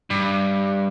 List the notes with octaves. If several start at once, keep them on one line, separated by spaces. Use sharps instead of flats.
G2